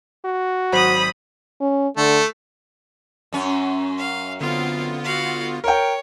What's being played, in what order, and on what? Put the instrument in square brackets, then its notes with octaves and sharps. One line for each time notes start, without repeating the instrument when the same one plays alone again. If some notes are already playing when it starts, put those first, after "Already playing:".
[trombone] F#4
[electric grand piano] G#1 F#3 C5 [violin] B5 D#6
[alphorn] C#4
[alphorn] D3 [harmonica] A3
[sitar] F#2 C#4
[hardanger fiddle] F5
[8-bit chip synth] D3 B3 F4 [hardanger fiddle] C4 F5
[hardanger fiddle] F#4 F5
[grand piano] A#4 G5 [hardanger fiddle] C#5